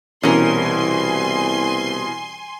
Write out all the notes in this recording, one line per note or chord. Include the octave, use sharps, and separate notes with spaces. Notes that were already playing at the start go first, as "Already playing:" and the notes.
C2 B2 E3 C#4 A#4 G#5 C6